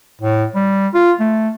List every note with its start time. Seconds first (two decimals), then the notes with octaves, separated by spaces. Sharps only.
0.22 A2
0.55 G3
0.94 F4
1.20 A3